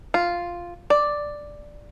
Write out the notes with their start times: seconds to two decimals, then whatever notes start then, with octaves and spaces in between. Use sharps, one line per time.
0.14 F4
0.90 D5